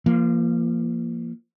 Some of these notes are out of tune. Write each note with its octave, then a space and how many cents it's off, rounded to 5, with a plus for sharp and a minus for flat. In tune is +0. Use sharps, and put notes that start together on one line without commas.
F3 -30 A#3 +0